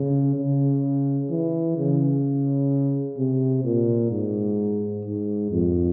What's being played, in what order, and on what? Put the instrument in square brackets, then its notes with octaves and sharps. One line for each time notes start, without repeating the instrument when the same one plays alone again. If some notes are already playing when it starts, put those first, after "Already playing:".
Already playing: [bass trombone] C#3
C#3
E3
C#3
C3
A#2
G#2
G#2
F2